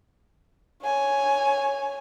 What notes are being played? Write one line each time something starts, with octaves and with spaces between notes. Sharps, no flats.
C#5 G#5